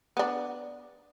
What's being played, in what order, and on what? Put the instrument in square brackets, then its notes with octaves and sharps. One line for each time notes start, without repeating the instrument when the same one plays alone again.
[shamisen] B3 D4